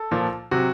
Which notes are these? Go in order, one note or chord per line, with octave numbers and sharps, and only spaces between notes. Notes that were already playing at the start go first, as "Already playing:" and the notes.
Already playing: A4
A#2 F3
C3 F#3 F#4